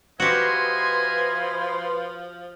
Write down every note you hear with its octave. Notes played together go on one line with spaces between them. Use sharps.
F3 F#4 G4 B4 D#5 E5 G#5 C6